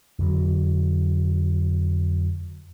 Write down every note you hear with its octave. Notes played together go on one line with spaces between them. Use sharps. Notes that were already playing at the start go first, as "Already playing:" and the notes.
F2 D3 F#3